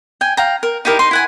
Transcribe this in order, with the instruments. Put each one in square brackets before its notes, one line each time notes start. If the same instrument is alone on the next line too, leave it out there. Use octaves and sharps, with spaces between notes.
[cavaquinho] G5 G#5
F5 G5 A#5
A#4
D#4 E4 G4 A#4
D#4 C6
E4 F#5 G#5